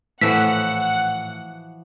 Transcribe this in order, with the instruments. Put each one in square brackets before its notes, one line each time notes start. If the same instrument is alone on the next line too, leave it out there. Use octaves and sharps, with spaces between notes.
[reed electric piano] A2 E6 [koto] E3 F3 F#4 [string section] F#5 [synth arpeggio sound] B6